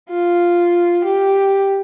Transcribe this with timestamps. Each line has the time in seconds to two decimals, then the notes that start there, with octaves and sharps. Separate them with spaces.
0.10 F4
1.05 G4